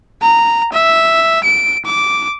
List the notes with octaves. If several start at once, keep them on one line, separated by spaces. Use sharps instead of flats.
A#5
E5
D7
D6